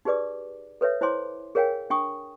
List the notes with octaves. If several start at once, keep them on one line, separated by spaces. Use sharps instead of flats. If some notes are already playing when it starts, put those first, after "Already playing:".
D#4 G4 G#4 B4 D5 D6
A4 B4 C#5 E5
E4 C5 C#5 G#5 C6 D6
G#4 A#4 C#5 F5 G5 G#5
D4 G5 G#5 C#6 D#6